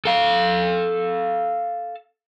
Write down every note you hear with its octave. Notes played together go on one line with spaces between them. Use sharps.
A4 F5